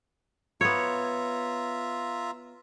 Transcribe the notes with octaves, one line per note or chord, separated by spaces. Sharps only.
B3 F4 C#5 E5 A#5